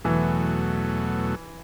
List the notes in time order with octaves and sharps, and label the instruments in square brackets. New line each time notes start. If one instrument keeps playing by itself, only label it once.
[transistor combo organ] E2 B2 F#3 A3 [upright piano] E3